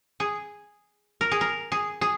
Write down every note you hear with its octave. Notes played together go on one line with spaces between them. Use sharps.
G#4
A#4
G#4
A#4
G#4
G#4